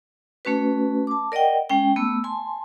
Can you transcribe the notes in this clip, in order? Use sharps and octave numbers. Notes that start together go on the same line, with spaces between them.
A3 C#4 F#4 B4
A5 D6
A#4 D5 D#5 F#5 G5
G#3 C#4 G5
A3 B3 E6
G#5 A5 C6